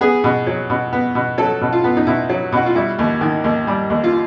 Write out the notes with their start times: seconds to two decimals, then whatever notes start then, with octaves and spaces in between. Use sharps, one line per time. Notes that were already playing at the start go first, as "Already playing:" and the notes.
0.01 B3 G#4
0.24 B2
0.47 F#3
0.70 B2
0.93 B3
1.15 B2
1.38 F#3 A4
1.61 B2
1.73 F4
1.84 B3
1.97 D#4
2.07 B2 E4
2.30 F#3
2.52 B2 F#4
2.66 F4
2.75 G3 E4
2.99 D#2
3.21 D#3
3.44 D#2
3.67 G3
3.90 D#2
4.04 F4